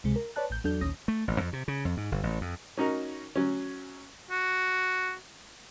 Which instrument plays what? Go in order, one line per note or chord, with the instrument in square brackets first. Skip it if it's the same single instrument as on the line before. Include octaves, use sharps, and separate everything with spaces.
[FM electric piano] C#2 C3 G#3
A#4
B4 C#5 D5 A5 F#6
A1 G6
E2 F#3 D4 A4 G6
A#1 D#2 C#4 D#6 A#6
[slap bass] A3
A1
F2
C3
C#3
F2
G#2
G1
A1
F2
[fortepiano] C#4 D#4 F#4 A#4
F#3 C#4
[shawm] F#4